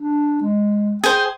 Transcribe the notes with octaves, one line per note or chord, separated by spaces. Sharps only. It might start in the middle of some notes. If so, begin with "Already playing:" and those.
D4
G#3
G#4 C5 G5